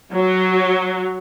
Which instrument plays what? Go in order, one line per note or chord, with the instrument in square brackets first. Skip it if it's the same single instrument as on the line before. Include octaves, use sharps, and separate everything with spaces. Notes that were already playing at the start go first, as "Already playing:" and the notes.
[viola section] F#3